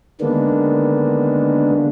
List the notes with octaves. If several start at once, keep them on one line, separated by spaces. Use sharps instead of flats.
D3 D#3 G#3 A#3 B3 D4